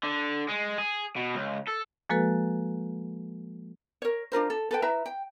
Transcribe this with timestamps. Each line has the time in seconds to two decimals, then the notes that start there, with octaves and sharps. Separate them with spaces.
0.04 D3
0.48 G#3
0.78 G#4
1.16 B2
1.35 C#2
1.67 A4
2.10 F3 G#3 A#3 F#4 A4 B4
4.02 A#4 C#5
4.32 D4 F4 A#4 C5
4.50 A4
4.71 A4 B4 G5
4.82 E4 B4 E5 A#5
5.06 G5